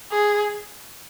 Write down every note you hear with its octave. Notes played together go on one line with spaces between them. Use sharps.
G#4